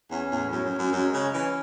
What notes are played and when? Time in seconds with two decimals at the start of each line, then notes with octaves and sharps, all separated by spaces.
0.11 E2 C#4
0.31 E2 A2
0.52 F#2 C#4
0.65 F#2
0.72 C#4
0.79 F#2
0.93 F#2 G#3
1.13 C#3 C#4
1.34 E3 C#4